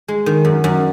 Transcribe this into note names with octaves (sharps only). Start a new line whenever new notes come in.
G#3
D#3
F#2
F#2